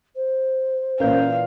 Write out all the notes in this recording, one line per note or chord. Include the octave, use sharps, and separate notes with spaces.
C5
A#2 E3 C#4 A#4 F5 G6